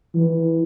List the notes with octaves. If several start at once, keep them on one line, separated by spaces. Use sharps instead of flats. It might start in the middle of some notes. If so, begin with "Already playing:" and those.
E3